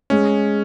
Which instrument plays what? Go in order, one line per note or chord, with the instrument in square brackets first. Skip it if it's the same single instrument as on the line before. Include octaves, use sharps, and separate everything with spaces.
[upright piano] G#3 [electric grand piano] C#4